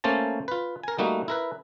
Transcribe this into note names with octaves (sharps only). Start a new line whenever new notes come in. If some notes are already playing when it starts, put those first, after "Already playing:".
A3 A#3 C#4 C5 A5
F4 B4
A#4 G#5
G3 A3 A#3 D#4 F#4
E4 A#4 B4